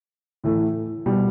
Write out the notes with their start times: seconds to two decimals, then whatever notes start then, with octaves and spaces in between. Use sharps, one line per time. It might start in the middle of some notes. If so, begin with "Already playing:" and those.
0.44 A2 E3 A3
1.06 B2 G3